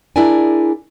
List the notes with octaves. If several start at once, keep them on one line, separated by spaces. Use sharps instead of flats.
D4 E4 G#4 A#4 D5 G#5